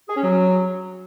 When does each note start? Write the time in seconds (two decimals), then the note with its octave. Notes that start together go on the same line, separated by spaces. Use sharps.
0.08 G#4
0.16 C#4
0.23 F#3